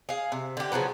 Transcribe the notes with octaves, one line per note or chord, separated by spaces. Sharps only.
G#4 F5
C3
D3 G4
C#3 F3 F#3 B3